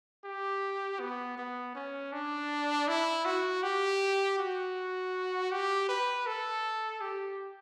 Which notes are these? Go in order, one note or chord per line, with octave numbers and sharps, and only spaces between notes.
G4
B3
B3
C#4
D4
E4
F#4
G4
F#4
G4
B4
A4
G4